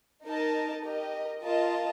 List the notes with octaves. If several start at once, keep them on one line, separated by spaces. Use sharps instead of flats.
D#4 A#4 D#5 A5
G4 A#4 D#5
F4 A#4 D#5 A5